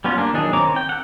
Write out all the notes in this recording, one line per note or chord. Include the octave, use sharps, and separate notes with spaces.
G3 B3 C#4 F4
A#3 D4
D#3 E3 F#3 D4 G#4
D#3 C4 C#5 A#5 D6
G5
A4 F#5